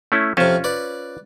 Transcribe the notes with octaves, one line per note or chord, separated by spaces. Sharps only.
A3 C#4 E4
F2 C3 C#4 F4 C5
B4 D5